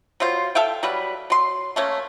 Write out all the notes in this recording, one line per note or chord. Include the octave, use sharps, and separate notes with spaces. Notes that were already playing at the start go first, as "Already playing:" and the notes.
F#3 G3 F4 C5
A4 E5 F5 G5
F#3 G3 B4
F#3 C6
A3 A#3 C#4